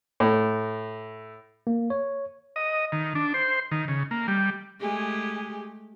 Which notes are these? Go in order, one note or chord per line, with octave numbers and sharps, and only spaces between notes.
A2
A#3
C#5
D#5
D#3
D4
C5
D#3
C#3
A#3
G3
G#3 A3 G4 G#4